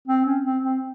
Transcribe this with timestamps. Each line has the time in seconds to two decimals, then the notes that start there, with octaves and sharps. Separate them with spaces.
0.08 C4
0.26 C#4
0.45 C4
0.64 C4